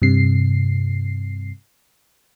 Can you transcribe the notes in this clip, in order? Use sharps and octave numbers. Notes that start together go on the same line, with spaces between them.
G2 C3 C7